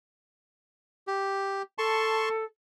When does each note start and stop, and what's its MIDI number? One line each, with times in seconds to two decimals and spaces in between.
1.07 1.62 67
1.78 2.44 69
1.78 2.29 81
1.78 2.29 84
1.78 2.29 85